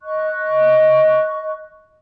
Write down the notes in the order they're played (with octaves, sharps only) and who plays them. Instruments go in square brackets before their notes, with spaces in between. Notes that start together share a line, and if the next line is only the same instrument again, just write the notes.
[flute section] D#5 C#6 F#6